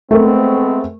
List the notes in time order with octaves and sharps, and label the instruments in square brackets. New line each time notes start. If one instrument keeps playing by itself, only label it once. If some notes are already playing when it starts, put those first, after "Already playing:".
[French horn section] G#3 B3 C4 [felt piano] A3 A#4